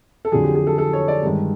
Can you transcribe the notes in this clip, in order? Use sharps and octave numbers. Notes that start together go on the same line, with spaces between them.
A4
F2 D3 F#3 G#4
G4
G#4
A4
A4
C#5
D5
G2 D#3 G#3